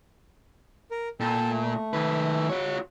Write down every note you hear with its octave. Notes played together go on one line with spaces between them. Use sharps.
A#4
A#2 A4 G5 A5
A3
D#3 B4
F4 F#4 C#5